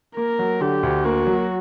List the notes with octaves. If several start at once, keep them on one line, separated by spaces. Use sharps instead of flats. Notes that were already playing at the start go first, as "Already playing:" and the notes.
A#3 A#4
F#3
D3 G4
D2
A#3 F#4
F#3